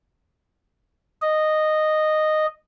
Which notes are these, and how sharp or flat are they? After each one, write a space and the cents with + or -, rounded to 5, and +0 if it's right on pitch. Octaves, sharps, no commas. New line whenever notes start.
D#5 -10